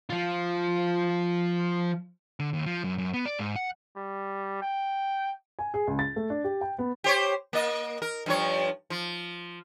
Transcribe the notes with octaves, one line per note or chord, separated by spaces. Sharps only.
F3 F4
D3
D#2
F3
F#2
F#2
B3
D5
G#2
F#5
G3
G5
G#5
G#4
C#2
A6
A3
D4
G4
G5
B3
G4 C5 C#5
A#3 D#5
A#4
G2 F3 C#5
F3